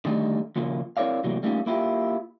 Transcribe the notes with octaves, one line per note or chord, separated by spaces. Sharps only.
D3 D#3 G3 A3 D#4
D#2 A#2 C#3 F3 A#3
C4 E4 A#4 C#5 D5 F5
A2 C3 E3 F#3 G3 A#3
G3 A3 A#3 C#4 D#4 F4
A#3 E4 F4 G4